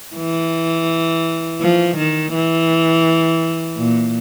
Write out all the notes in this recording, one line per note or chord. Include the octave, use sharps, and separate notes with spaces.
E3
F3
D#3
E3
A#2